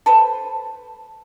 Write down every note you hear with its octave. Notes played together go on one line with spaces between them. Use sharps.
A4 B4 C5